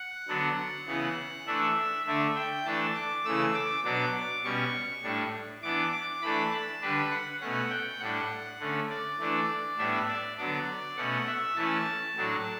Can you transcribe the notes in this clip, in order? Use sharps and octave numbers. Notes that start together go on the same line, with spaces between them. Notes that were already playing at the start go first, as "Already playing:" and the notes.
Already playing: F#5
D3 F#3 B3 D4
C#3 E3 B3
E3 A3 D4 E5
D3 A3 D4 E5
G5
E3 A3 D4 A5
D6
C#3 E3 A3 E6
D6
B2 F#3 B3 D4 D6
B2 G3 C#4 C#6
A2 G3 D4
E3 B3 D4 D6
D6
E3 A3 D4 B5
A5
D3 G3 D4 B4
F#5
B2 A3 C#4 F#5
G5
A2 G3 D4 F#5
D3 A3 C#4
D5
E3 A3 D4
A2 G3 B3 D4 E5
D5
D3 F#3 B3 D4 D5
B2 A3 C#4 F#5
E5
E3 A3 C#4 A5
A2 F#3 A3 D4